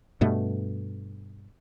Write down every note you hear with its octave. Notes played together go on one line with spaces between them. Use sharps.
G2 B2 A3